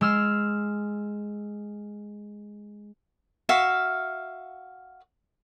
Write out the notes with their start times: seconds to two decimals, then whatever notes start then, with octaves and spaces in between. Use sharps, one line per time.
0.01 G#3 E6 F6
3.49 F#4 E5 F5